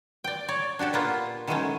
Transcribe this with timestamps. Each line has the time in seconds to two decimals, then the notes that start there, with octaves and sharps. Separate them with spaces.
0.24 D5 G5
0.48 C#5 D5
0.79 D4 F#4 G4 A4
0.93 A#2 A#3 B3 F4
1.47 D#3 E3 F#3 G#3 A3 C#4